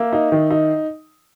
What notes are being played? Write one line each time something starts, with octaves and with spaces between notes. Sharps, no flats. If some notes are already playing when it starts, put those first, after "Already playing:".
Already playing: A#3 E5
D#4
D#3
D#4